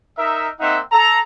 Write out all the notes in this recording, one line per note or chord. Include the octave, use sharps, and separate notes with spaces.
D#4 A#4 E5
A#3 C4 D#4 E5 F#5
A4 A#5